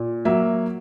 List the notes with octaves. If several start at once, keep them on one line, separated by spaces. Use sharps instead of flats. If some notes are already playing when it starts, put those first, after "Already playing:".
Already playing: A#2
F#3 A#3 E5